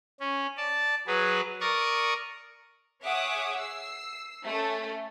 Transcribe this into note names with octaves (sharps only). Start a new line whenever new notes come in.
C#4
D5 A5
F#3 G#4 B4
A#4 D5 C#6 D#6
G#4 C#5 E5 F#5 D6 D#6
E6 C7
A3 C#4